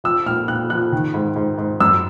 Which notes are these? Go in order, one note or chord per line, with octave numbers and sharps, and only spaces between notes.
F3 E6
A#2 F6
A#2 F#6
F3 F#6
D#3
G#2
G#2
G#2
F#2 E6